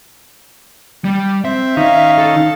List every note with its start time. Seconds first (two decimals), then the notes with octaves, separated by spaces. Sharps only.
1.04 G3
1.45 C4 E5
1.77 D#3 C#4 D#4 F5
2.18 A4